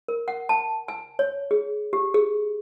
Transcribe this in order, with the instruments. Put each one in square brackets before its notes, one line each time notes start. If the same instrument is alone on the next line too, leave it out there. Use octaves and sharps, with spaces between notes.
[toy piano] A#4
F#5
A5
G#5
C#5
G#4
G4
G#4